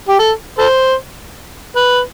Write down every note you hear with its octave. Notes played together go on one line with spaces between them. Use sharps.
G4
A4
A4 C5
B4